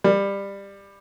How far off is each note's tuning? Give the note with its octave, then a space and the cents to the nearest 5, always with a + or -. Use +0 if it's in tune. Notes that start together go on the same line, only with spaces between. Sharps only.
G3 +20